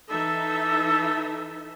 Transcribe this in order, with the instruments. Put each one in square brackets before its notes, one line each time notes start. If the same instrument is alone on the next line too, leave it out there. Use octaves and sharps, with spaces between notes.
[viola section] E3 D#4 E5 [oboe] A4